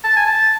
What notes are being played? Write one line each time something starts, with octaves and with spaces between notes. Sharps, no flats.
A5
G#5
A5